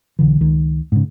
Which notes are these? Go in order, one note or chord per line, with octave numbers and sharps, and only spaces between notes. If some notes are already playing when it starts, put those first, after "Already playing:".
B1 D3 E3
C#2 D#3
G#2 C#3